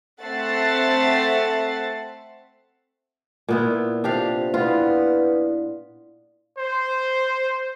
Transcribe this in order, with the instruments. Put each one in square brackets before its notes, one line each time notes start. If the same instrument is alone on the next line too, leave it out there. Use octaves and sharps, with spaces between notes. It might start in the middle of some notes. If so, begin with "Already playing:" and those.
[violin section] A3 C4 E5 F#5 A6 C7
[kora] A#2 B3 E4 [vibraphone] D5
[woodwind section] C3 [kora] D4 G4 F5 [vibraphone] F4
[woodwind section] B3 [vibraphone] E4 D5 [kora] F4
[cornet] C5